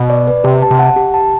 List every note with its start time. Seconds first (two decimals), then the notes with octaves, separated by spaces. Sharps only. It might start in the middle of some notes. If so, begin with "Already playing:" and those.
Already playing: B2
0.10 D5
0.27 B4
0.44 C3 G4
0.62 A5
0.71 C3
0.79 F#5
0.96 G4
1.14 A5